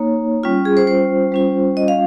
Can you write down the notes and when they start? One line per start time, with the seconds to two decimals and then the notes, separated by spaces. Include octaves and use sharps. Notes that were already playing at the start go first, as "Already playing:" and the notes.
Already playing: A#3 D#4 C#5
0.43 G3 C#4 F4
0.65 G#4
0.77 C5
0.87 C5
1.32 G3 C#4 F4
1.77 D#5
1.88 F5